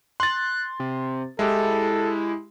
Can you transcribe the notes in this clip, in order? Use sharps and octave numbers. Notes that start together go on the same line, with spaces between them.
C6 F#6 A6
C3
G#3 E4 G4 A4